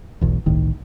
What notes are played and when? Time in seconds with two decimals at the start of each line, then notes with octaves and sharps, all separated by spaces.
0.21 E1 B1 E2
0.46 G1 C2 A2 D#3